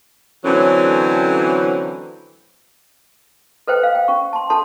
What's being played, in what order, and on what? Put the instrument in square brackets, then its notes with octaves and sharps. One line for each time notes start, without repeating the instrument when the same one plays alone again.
[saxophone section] D3 E3 F#3 A3 C4 C#4
[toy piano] A4 B4 C5 G5
C5 F5
G5
C#4 C#6
A5 C6
D4 A4 A5 C6